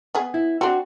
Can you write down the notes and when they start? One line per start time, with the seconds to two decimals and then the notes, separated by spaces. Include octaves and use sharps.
0.15 B3 G#4
0.34 E4
0.61 C4 D4 F#4